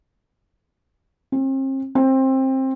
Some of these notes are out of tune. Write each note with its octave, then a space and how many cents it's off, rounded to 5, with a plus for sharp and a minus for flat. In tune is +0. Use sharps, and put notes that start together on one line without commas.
C4 +40
C4 +20